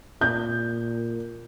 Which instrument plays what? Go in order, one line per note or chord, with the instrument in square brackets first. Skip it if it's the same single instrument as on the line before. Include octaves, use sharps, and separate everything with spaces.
[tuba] A#2 [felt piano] G6